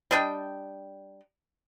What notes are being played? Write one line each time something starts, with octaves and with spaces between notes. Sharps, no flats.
G3 D4 D#5 G5